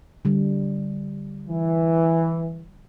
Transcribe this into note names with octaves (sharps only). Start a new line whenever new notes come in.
D3 G3
E3